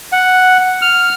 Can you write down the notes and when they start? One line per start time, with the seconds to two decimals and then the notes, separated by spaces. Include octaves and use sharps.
0.12 F#5
0.82 F6